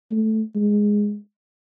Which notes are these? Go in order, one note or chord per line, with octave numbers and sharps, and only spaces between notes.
A3
G#3